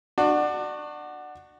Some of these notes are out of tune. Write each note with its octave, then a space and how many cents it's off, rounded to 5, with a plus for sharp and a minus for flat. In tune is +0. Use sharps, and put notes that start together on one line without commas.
D4 +25 F#4 +0